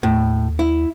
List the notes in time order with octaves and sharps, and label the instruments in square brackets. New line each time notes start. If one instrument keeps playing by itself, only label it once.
[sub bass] D#2 [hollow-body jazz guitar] A2
[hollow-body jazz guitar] E4